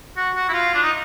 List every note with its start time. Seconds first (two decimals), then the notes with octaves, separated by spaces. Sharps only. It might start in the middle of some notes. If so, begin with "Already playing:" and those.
0.17 F#4
0.35 F#4
0.49 E4
0.53 F4
0.74 D4
0.83 D#4